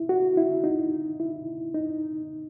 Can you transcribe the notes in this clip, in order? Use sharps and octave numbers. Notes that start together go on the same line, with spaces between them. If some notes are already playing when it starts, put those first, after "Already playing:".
Already playing: E4
F#4
E4
D#4
E4
D#4